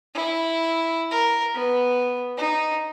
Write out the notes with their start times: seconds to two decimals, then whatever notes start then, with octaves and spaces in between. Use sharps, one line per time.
0.14 E4
1.11 A#4
1.55 B3
2.37 D#4